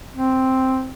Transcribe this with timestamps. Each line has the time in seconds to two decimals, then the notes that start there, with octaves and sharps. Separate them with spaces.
0.14 C4